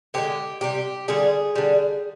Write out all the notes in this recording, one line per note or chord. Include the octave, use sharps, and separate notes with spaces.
D3 F3 G#3 G4
C3 G3 G4
D3 G3 G#4
D3 G3